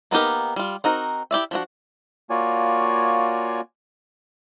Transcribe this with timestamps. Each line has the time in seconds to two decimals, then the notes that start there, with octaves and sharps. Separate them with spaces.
0.11 A#3 B3 D#4 G4 A#4
0.56 G3 F4
0.84 C4 D#4 F#4 A#4
1.31 E4 G4 D5 E5
1.51 F3 D4 F#4
2.30 A#3 F4 F#4 C#5 D5 G#5